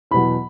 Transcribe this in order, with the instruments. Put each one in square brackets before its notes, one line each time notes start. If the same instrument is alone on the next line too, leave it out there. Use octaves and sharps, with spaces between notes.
[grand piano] E2 B2 F#3 B5